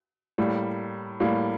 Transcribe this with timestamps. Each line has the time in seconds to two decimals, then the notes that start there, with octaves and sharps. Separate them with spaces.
0.38 A2 G3 A#3
1.20 A2 G3 A#3